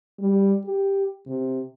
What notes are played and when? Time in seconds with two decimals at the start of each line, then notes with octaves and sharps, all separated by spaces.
0.19 G3
0.66 G4
1.27 C3